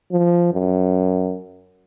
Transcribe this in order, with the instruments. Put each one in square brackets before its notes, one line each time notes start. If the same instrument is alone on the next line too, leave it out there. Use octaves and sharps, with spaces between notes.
[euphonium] F3
F#2